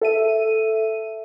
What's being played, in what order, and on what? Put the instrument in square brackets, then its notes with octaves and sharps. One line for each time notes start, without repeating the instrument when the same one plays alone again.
[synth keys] A4 E5 D#7